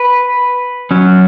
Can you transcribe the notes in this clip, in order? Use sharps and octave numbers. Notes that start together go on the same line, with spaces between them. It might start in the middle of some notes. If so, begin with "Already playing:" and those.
Already playing: B4
F#3 C#4